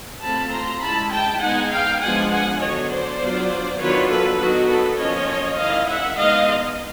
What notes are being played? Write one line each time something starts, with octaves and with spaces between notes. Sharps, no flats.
A3 C4 F4 A5 B5
A#5 C6
G#3 C#4 E4 A5 B5
G5 A5
G#3 B3 D#4 F#5 G#5
F5 G5
F3 G#3 B3 D4 F4 F#5 G#5
F#5 G#5
D3 F#3 B3 D4 C#5 D#5
C5 D5
F#3 B3 D4 F4
D#3 F#3 B3 D4 F4 B4 C#5
A4 B4
F#3 B3 D#4 F#4
A4 B4
F3 A#3 C#4 F4 C#5 D#5
D#3 G#3 C#4 E4 D#5 F5
E5 F#5
G#3 B3 D#4 D#5 F5